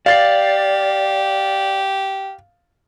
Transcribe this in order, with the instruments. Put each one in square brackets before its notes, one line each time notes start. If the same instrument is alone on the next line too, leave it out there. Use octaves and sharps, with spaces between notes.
[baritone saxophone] G4 [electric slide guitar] D5 [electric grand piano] F5 A6 C7